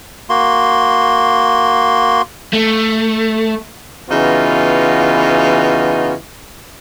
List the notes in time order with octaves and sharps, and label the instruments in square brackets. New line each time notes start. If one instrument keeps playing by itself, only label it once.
[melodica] A#3 F#4 C6
[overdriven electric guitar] A3
[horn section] C#3 E3 B3 D#4 F4 F#4